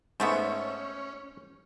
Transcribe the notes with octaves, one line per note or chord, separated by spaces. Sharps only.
G#2 A3 B3 C#4 C5 C#5 E5